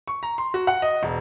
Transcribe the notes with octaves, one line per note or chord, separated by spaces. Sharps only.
C#6
A#5
C6
F#4
F#5
D#5
E1